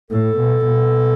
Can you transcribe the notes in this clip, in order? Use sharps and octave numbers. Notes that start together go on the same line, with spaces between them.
A2 A4
B2
B2